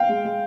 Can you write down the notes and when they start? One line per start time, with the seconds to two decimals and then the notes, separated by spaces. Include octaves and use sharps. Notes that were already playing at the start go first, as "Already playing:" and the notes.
Already playing: F5 G5
0.09 G#3
0.25 G#3